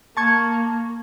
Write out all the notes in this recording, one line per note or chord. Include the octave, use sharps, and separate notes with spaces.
A#3 A5 C#6 G#6